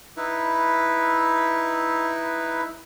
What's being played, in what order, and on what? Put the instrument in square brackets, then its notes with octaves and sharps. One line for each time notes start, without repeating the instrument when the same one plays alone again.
[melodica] D#4 E4 B4